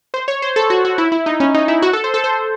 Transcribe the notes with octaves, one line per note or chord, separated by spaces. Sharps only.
C5
C#5
C5
A4
F#4
F#4
E4
E4
D#4
C#4
D#4
E4
F#4
A4
C5
A4
C5